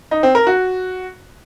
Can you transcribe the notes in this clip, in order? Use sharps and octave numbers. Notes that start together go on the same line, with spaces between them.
D#4
C4
A#4
F#4